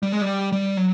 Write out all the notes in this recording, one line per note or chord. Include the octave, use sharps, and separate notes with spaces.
G3
G#3
G3
G3
F#3